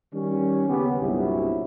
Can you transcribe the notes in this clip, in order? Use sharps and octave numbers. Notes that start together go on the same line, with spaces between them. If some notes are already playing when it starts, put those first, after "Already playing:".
D#3 G3 C#4
D#2 C#3 B3 C#4 G4
C2 G2 A#2 F#3 E4 F#4